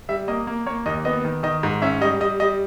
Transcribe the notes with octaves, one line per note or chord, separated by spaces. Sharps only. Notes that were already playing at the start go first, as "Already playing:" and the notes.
G3 E5
A#3 D#5
A#3
A#3 C#5
D#2 D#5
B3 D#5
D#3
D#3 D#5
G#2
C#4 E5
G3 D#5
G3 D#5
G3 D#5